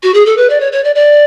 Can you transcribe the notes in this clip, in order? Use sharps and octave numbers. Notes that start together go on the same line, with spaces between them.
F#4
G#4
A4
B4
D5
C#5
C#5
D5
D5